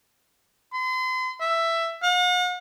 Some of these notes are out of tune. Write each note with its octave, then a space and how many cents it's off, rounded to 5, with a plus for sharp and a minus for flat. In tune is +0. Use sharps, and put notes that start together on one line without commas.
C6 -40
E5 +10
F#5 -45